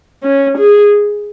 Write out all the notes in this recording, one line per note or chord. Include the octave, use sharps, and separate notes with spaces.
C#4
G#4